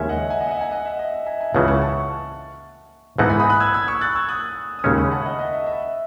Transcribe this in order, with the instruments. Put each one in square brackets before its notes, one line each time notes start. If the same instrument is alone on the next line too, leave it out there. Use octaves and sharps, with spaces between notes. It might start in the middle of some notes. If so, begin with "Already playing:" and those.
Already playing: [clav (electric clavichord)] D#2 C#3 G#3 C#4 [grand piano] E5 G#5
[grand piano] D#5 F#5
E5 G#5
D#5 F#5
E5
D#5 F#5
E5 G#5
D#5 F#5
E5
D#5
E5
E5 G#5
E5 G#5
[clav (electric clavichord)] C#2 C#3 E3 [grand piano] F#5 A5
[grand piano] A5 C#6
A5 C#6
[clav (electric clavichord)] G#2 E3 B3 D#4 [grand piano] F#5 A5
[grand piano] G#5 B5
B5 D#6
D#6 F#6
E6 G#6
E6 G#6
C#6 E6
F#6 A6
E6 G#6
D#6 F#6
D#6
[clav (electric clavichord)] D#2 C#3 G#3 C#4 [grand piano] C#6 E6
[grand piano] B5 D#6
F#5 A5
E5
D#5 F#5
D#5 F#5
E5
E5